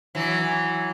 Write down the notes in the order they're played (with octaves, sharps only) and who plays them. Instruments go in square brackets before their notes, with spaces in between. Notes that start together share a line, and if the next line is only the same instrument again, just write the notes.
[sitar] E3 F#3